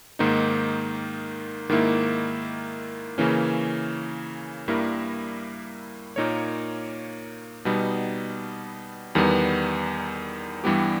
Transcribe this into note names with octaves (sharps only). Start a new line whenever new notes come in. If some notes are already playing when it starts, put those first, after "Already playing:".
G#2 D#3 A#3 D#4
G#2 D#3 A#3 E4
C#3 E3 A#3 C#4
G2 G3 A#3 E4 A#4
A#2 A#3 D#4 A#4 C#5
B2 G3 B3 D#4
E2 D#3 G3 B3
G2 E3 G3 B3 G4